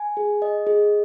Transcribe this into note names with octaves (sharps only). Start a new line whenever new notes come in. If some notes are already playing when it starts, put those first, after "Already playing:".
Already playing: G#5
G#4
D#5
G#4